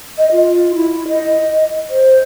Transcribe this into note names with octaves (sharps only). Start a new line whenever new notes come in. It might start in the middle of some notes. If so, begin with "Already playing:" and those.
D#5
F4
E4
D#5
C5